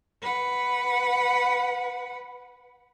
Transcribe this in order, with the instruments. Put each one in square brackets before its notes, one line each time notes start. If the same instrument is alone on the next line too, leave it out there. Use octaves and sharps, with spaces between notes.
[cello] B4 F#5